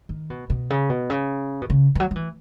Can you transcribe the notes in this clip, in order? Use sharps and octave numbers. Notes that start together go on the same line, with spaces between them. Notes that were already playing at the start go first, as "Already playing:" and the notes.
D#3
B2
B2
C#3
B2
C#3
B2
C#3
E3
F#3
F#3
E3